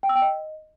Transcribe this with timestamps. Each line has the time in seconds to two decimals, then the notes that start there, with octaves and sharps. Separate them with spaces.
0.03 G5
0.09 E6
0.16 G5
0.22 D#5